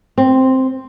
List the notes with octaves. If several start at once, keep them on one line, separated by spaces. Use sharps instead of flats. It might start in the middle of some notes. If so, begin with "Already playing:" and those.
C4